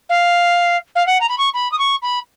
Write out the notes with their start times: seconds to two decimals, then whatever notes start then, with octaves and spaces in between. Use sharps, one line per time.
0.09 F5
0.95 F5
1.06 F#5
1.20 A#5
1.29 B5
1.38 C#6
1.54 B5
1.71 D#6
1.78 C#6
2.02 B5